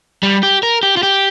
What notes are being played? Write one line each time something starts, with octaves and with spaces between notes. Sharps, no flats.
G3
G4
A#4
G4
F4
G4